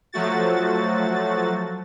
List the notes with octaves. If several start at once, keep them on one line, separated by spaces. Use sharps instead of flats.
F3 F#3 A3 F#4 A6